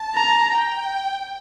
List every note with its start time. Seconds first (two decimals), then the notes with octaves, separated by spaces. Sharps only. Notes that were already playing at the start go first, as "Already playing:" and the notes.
Already playing: A5
0.15 A#5
0.54 G5